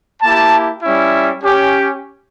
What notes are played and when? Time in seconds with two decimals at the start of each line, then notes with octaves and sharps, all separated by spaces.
0.22 A#3 E4 G4 A5
0.83 G3 C#4 E4
1.42 C#4 G4